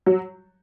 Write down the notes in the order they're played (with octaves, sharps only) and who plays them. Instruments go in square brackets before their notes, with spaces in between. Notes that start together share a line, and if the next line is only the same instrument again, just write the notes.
[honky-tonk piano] F#3